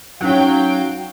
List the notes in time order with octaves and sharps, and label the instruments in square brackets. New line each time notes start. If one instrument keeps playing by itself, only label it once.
[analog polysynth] F#3 [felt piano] C#4 D#4 [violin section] F5 G5